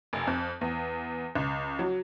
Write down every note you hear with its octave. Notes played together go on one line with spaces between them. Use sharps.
F1
F2
E2
C#2
F#3